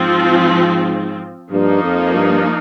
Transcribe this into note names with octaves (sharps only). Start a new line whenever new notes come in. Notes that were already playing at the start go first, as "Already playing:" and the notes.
Already playing: G#2 F3 C4 F4
G2 F3 A#3 D#4
F2
G2